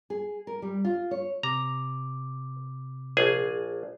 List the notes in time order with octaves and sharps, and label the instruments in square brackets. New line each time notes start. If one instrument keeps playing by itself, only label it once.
[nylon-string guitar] G#4
A#4
G3
F4
C#5
[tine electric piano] C3 D6 [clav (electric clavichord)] A#5
[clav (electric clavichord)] A#1 G#4 G#5